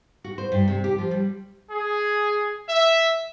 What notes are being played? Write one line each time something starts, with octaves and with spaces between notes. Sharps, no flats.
F#4
C5
G2
C3
G4
F3
G3
G#4
E5